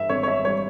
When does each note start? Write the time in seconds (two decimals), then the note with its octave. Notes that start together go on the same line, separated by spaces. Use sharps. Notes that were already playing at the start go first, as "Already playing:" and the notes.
Already playing: G2 E5
0.09 G#1 C#5
0.23 C#5
0.28 E5
0.44 G3 C#5